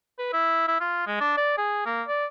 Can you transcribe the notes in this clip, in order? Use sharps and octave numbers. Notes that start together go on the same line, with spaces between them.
B4
E4
E4
F4
G#3
D4
D5
G#4
A#3
D5